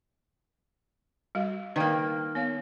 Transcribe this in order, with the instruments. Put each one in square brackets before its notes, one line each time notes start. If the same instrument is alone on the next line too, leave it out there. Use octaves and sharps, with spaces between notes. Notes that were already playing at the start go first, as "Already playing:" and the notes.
[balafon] G3 F#4 F5
[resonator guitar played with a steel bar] D#3 A#3 [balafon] B4 D5 G5
[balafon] B3 C#5 F5